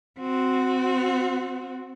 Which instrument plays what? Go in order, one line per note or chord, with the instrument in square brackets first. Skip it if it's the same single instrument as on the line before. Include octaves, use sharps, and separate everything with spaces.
[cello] C4 F#4